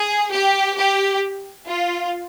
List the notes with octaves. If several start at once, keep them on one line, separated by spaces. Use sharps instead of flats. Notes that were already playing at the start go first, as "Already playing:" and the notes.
Already playing: G#4
G4
G4
F4